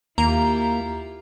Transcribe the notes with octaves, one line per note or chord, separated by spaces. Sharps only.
D#2 A#3 E4 F4 G4 A#5